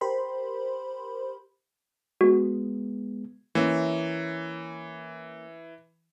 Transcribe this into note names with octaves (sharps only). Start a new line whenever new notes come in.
G4 A#4 C5 B5 C6
G#3 B3 F#4
E3 A#3 C#4 E5